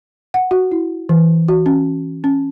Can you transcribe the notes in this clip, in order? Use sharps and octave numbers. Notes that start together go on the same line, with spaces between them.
F#5
F#4
E4
E3
F#4
C#4
C#4